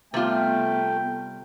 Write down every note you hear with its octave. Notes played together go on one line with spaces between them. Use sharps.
C3 G3 A3 B3 F4 G5